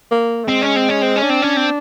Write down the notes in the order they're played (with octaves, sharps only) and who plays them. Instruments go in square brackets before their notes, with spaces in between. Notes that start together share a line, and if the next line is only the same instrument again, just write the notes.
[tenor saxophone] A#3
A3
[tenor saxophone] G#3 [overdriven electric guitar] C4
[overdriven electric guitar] C#4
C4
C#4
C4
C#4
[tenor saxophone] D4
[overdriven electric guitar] C4
C#4
C4